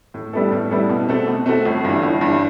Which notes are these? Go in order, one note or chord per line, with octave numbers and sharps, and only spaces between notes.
A2
G3 B3 E4 A4
A2
G3 B3 E4 A4
B2
A3 C4 F#4 A4
B2
A3 C4 F#4 A4
G1
G2 E3
G1
G2 E3